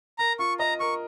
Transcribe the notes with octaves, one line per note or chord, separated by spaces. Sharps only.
A#4 A#5
F4 C#6
D#5 A#5
A#4 C#6